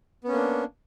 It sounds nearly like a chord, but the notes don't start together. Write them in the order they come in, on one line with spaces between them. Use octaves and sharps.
B3 C#4 A#3 D4